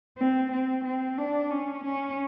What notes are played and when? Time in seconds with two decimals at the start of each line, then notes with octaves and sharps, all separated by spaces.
0.18 C4
0.52 C4
0.85 C4
1.18 D4
1.51 C#4
1.84 C#4